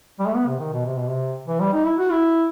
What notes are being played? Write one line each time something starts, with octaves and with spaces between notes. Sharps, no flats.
G3
A3
B3
C3
D#3
B2
C3
B2
C3
E3
G3
D#4
E4
F#4
E4